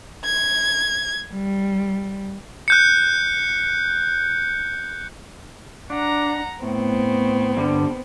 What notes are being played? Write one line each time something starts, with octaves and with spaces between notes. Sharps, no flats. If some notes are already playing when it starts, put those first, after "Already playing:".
G#6
G3
F#6 G6 C#7
D4 F#5 A#5
A2 B3 C4
G2 D3 G3